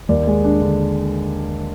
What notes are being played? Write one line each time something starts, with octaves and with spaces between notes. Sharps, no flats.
D#2 D5
G#3
D4
D3